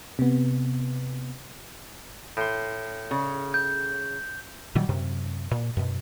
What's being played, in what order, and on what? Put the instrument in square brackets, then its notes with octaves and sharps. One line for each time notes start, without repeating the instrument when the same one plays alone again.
[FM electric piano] C3 B3
[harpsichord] A2 C6
[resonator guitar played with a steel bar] C#3
[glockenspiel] G6
[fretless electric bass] A#2 D#3 F#3 G3
F#2 C3
A#2
F#2 B2